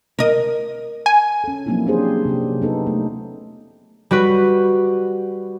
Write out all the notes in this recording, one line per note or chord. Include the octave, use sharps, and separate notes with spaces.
A#4 D#5
G#5
C#4 A4
F3 F#3 A#3 C4 D#4 E4
C#4 D4 G4 G#4 C5
C3 F#3 G4
B3 D#4 A4
A3
G3 F#4 B4